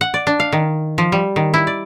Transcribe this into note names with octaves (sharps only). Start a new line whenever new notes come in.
F#5
D5
D4
F5
D#3
F3
G3
D#3
E4
D5